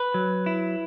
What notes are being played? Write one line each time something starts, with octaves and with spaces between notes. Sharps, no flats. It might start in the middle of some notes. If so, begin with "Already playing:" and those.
Already playing: B4
F#3
E4